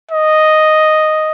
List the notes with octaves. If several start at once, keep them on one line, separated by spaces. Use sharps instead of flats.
D#5